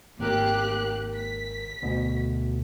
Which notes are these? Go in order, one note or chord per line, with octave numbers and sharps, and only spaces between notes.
G#1 A#3 G4 A#4 F#6
B6
D2 B2